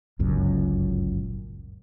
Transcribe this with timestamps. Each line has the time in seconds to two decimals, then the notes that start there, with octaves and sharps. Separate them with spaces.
0.19 G1 C#2 F#2 A#2